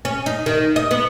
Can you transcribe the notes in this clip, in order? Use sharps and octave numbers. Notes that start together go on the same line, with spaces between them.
C#4
D#4
D#3
D#5
B3